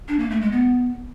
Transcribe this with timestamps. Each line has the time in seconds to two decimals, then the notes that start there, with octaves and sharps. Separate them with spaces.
0.08 D4
0.19 A#3
0.30 A3
0.41 G#3
0.52 B3